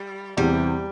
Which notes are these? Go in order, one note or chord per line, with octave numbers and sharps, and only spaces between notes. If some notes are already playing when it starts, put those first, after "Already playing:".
Already playing: G3
E2 C3 E3 G3